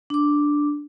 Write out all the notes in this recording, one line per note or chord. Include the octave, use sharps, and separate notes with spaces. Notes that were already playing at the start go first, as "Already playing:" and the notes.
D4 D6